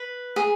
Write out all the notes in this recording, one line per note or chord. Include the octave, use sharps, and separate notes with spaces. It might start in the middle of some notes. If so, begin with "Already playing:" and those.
Already playing: B4
G#4